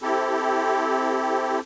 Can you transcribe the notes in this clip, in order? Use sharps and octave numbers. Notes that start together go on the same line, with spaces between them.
C4 E4 G4 A4